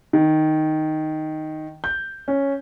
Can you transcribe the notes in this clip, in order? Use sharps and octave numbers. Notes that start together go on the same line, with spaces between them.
D#3
G6
C#4